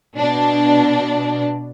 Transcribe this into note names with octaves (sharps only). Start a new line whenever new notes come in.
B2 D4